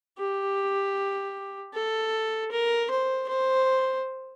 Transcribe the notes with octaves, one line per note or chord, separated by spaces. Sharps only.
G4
A4
A#4
C5
C5